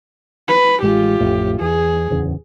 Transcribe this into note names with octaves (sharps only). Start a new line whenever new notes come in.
B4
A1 G#3 F4 G4
A1 F2 A2
E2 G#4
D1 E2 C#3